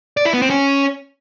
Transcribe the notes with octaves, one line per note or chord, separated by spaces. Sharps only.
D5
E4
B3
C4
C#4